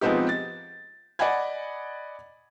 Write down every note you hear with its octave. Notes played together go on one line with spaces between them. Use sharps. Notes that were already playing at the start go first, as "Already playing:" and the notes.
F3 G#3 B3 C4 D#4 G4
A6
D5 D#5 F#5 G#5 B5 G#6